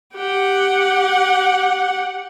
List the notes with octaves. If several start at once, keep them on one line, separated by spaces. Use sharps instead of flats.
G4 F#5